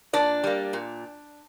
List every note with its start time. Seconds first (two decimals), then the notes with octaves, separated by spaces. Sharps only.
0.13 A#2 D4 D5
0.44 G3 A#3
0.73 A#2